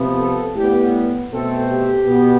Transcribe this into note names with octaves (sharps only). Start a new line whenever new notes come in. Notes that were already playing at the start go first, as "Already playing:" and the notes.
Already playing: C3 F3 B3
A4
A2 G3 B3 G4
B2 A3 C4 A4
G4
B2 B3